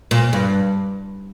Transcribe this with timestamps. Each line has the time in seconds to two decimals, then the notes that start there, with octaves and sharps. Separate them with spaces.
0.11 A#2
0.33 G2